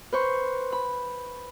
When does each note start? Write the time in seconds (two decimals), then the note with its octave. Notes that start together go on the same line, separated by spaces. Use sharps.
0.12 B4 C5 C#6
0.72 B5